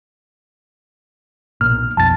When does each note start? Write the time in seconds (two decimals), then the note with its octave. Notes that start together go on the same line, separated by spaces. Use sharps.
1.61 B1 A#2 F6
1.97 B1 F2 A5 A6